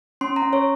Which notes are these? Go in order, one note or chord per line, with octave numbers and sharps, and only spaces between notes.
C#4 C6
A#5
C#4
C#5